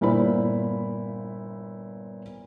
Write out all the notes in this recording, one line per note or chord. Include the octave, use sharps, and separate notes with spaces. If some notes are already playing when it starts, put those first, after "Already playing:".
G1 A#2 E4 C5 B5